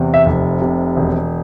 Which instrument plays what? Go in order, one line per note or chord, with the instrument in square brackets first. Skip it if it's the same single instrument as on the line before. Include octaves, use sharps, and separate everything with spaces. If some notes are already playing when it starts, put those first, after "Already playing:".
Already playing: [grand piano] E2 C3
E5
F1
C3
E1